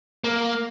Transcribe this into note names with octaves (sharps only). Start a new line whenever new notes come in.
A#3